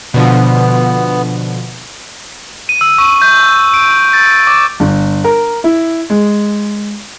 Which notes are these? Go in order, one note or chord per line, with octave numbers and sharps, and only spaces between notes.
B2 D3 F3 B3
D#7
E6
C#6
G6
D7
A6
D6
G1
A#4
E4
G#3